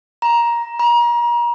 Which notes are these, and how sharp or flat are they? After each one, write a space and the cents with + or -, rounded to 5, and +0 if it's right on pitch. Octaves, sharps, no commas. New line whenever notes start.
A#5 +15
A#5 +35